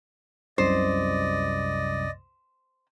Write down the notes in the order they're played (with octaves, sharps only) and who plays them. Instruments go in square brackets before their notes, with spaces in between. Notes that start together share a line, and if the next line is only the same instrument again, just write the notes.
[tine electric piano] C2 F#2 C3 [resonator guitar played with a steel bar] C5 [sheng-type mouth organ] D5 D#5